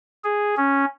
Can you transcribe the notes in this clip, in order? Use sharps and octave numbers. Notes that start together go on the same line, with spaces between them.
G#4
C#4